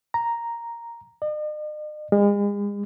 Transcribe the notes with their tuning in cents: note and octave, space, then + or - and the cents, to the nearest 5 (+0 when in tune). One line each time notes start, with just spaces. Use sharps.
A#5 +0
D#5 -45
G#3 -40